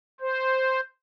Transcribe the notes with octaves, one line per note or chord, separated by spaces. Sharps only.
C5